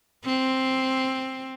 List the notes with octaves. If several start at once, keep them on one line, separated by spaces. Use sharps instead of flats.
C4